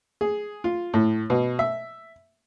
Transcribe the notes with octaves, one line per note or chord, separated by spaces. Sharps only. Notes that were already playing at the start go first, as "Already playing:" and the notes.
G#4
F4
A2
B2
E5